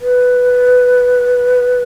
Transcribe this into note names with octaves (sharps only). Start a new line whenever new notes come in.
B4